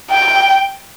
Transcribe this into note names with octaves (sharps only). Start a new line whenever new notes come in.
G5